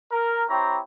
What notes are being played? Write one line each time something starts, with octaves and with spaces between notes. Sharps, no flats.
A#4
C4 E4 G4 C#5 A#5